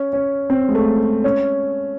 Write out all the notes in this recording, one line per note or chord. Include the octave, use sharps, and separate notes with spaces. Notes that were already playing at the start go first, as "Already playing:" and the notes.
Already playing: C#4
C#4
C4
G#3
A3
C#4